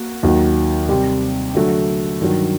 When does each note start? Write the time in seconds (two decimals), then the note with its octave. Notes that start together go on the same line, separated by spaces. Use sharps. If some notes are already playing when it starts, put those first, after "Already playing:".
Already playing: A#3 F#4
0.23 D#2 D#3 F#3 A#3 F#4
0.89 C3 G3 C4 G4
1.55 D3 F#3 A3
2.21 G2 D#3 F#3